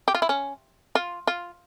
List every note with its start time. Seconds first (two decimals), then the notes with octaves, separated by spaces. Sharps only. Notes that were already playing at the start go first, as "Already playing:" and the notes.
0.08 G4
0.15 F4
0.22 E4
0.29 C#4
0.95 F4
1.27 F4